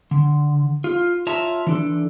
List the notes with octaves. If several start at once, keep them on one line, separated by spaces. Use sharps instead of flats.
D3
F4
F4 C#5 E5 A5 A#5
E3 D4 A4